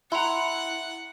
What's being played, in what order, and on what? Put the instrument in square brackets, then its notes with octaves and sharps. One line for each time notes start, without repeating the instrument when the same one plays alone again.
[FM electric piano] E4 [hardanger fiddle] F#5 [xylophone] A#5 C6